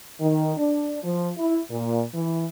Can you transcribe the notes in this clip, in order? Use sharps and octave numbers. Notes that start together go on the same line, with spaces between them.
D#3
D4
F3
E4
A#2
E3